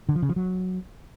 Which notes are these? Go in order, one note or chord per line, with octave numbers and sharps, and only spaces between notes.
D3
F3
C#3
F3
F#3